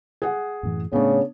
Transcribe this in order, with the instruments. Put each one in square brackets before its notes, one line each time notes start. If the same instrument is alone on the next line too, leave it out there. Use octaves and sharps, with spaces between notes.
[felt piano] G#4 F#5
[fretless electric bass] F#2 A2 E3
[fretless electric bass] A2 A3 [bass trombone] C#3 [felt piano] B3 D4 [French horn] C#5